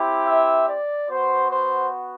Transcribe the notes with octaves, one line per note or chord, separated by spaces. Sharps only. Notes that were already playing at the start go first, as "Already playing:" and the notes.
Already playing: C4 E4 G4
E5
D5
B3 F#4 C5
C5